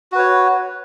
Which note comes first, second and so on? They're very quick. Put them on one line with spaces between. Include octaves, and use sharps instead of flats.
F#4 B4 C#5